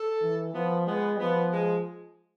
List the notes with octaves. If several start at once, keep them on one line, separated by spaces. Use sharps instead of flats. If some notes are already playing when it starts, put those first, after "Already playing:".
Already playing: A4
E3
F3 B3
G#3 B3
F3 B3
G#3